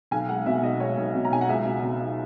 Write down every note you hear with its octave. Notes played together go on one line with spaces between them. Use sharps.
B1 G#5
G#3 F#5
B2 E5
B1 D#5
G#3 C#5
B1
B2
A#5
B1 G#5
F#5
C#2 E5
B2
B2
D#4